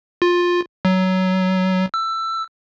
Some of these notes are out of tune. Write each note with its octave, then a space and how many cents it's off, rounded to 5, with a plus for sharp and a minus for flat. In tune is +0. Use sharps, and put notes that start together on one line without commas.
F4 +15
F#3 +15
E6 +15